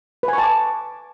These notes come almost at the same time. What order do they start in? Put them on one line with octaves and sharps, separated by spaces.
B4 G#5 C#6 A5 D6